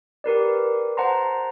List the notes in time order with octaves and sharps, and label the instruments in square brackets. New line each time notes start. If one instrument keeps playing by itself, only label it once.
[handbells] G4 A#4 B4 D5
C5 F#5 A5 A#5 C6